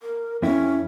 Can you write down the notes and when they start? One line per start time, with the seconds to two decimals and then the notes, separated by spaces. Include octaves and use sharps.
0.02 A#4
0.42 F2 C#4 E4